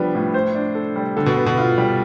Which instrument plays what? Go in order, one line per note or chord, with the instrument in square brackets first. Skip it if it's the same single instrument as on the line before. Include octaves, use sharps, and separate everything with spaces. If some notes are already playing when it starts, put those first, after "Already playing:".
Already playing: [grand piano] F3 [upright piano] G3 B3 D4
[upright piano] A2
C5
D4
A4
G3
[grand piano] D3 [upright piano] A4
[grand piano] B2
[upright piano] B3
[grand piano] B2
[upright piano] F4
G3